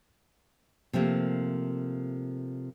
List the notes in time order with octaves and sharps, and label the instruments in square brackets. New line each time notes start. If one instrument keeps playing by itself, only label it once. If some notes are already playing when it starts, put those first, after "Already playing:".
[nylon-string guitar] C3 F3 A3 A#3